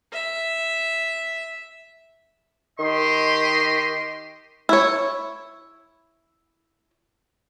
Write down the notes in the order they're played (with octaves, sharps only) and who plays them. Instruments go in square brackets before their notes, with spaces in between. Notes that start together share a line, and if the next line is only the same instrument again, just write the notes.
[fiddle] E5
[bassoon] D#3 [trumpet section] G4 D#5 C6
[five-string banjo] E4 C#5